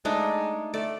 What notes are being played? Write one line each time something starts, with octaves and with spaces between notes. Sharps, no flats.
G#3 A3 D4 D#4
A3 D5